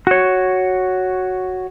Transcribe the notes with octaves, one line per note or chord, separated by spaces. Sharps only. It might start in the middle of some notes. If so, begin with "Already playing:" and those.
F#4 C#5